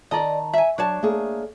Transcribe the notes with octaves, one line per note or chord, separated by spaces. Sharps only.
D#3 D5 D#5 A5 A#5
E5 G#5
F#3 D4 C#5 A5
A3 A#3 G#4